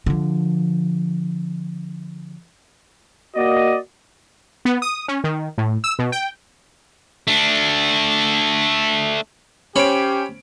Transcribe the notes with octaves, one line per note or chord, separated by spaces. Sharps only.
D3 F3
A#3 F#4 D5 D#5
B3
D#6
C#4
D#3
A2
E6
B2
G5
A3 D4
C#4 G4 C5 C#5 B5 D7